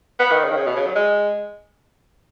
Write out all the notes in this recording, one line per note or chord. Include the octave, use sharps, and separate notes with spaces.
B3
D#3
C#3
D#3
C#3
B2
C#3
F#3
G#3